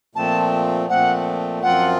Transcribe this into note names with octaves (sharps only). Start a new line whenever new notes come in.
A#2 F3 A3 C4 A5
A#2 F3 A3 C4 F#5
F#2 F3 C4 F4 F#5